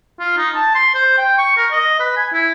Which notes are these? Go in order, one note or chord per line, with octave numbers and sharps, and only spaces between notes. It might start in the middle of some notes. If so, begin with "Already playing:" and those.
F4
D#4
A5
C6
C5
G5
C#6
A#4
D#5
B4
G#5
E4